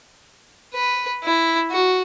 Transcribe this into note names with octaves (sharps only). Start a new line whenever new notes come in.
B4
E4
F#4